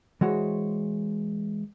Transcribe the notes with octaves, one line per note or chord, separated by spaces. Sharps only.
E3 G#3 F#4 C5 C#5